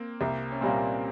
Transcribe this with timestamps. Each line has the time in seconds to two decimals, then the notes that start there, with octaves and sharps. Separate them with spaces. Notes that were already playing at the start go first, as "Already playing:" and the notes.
Already playing: A#3 C4
0.21 C2 A#3
0.52 C#4
0.61 A#2 G3 A#3 C4